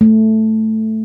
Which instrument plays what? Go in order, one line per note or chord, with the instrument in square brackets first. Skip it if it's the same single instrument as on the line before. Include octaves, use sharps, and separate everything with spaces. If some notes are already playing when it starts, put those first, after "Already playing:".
[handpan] A3